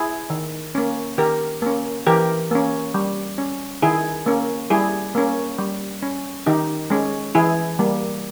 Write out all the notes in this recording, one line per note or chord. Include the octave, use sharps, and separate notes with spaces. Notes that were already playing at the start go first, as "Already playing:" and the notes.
Already playing: E4 G#4
D#3
A#3 C#4
D#3 G4 A#4
A#3 C#4
E3 G4 A#4
A#3 C#4
G3
C#4
D#3 E4 G#4
A#3 C#4
G3 E4 G#4
A#3 C#4
G3
C#4
D#3 D#4 G4
G#3 C#4
E3 E4 G#4
G3 A#3